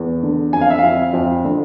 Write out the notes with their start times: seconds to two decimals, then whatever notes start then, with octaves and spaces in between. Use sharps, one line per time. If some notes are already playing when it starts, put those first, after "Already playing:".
Already playing: E2
0.23 D3
0.53 F2 G#5
0.61 F5
0.70 E5
0.79 F2 F5
1.14 F2
1.44 D3